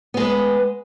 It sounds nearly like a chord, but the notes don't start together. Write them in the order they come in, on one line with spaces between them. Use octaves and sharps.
B3 G#3 B4